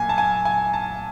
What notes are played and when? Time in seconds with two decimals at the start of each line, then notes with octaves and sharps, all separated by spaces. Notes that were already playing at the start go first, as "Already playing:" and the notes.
Already playing: A#2 F#3 A#3 G#5
0.09 A5
0.18 G#5
0.45 G#5
0.73 A5